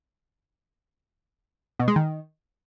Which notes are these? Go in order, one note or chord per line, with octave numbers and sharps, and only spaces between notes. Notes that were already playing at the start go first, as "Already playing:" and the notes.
B2
G#3
D#3